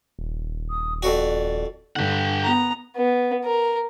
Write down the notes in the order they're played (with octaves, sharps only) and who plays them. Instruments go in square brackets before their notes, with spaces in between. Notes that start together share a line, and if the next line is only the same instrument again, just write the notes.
[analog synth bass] D#1
[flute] D#6
[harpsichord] F2 F#4 [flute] D5
[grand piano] G2 D3 [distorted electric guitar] G4 F#5
[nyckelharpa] B3 A#5
[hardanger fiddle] B3
A#4